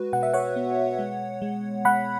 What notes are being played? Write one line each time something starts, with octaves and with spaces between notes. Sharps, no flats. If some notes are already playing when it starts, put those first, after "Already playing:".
Already playing: G#3 F#4 B4
B2 F#5
E5
C#5 F#5
B3
G#3
G#3
G#3 F#5 B5